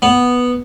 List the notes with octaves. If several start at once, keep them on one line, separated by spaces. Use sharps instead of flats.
B3